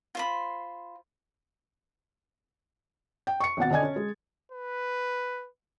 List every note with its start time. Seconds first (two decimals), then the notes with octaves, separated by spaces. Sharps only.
0.15 F4 C5 B5
3.27 G5
3.40 C#6 C#7
3.57 G#1 B2 F#5 A6
3.70 D3 D4 D#5 G#5 G#6
3.83 C#4
3.96 G#3
4.52 B4